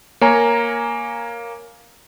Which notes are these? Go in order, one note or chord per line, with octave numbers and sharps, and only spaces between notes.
A#3 C#5 G#5 A#5